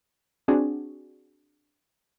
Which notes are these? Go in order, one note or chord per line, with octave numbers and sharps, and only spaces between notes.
C4 D4 F#4 G#4